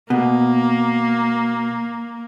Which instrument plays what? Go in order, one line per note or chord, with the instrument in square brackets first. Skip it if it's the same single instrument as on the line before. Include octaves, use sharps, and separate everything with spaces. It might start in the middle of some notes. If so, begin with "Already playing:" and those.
[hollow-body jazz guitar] B2 [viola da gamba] A#3